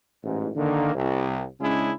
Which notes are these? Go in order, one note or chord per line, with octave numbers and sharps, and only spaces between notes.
A1 G#2
D3 D#3 A#3
C2
C#3 G#3 C#4 D4 E4 G#4